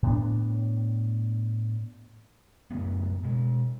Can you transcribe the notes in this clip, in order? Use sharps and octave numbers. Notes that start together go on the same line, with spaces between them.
A2 B3 D4
F#2 C#3 A3 B3
B2 G#3